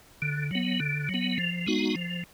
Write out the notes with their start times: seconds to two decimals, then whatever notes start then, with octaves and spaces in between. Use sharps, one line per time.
0.22 D3
0.51 F#3 B3
0.80 D3
1.09 F#3
1.14 B3
1.38 F3
1.67 G#3 B3 D#4 F#4
1.95 F3